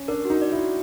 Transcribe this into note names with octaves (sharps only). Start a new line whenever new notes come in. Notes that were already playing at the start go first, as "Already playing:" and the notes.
Already playing: C#4
D4 A#4
F#4
D#4
D5
E4
F#4